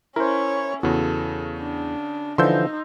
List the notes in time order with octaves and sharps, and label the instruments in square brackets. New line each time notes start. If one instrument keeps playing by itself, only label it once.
[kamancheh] C#4 C#5 [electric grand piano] E4 [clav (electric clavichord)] A#4 C5
[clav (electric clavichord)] E2 [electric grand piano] C#3 F#4 [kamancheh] A4
[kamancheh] D4
[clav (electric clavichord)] D3 E3 F3 [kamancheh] D#4 [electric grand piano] C6 E6 G6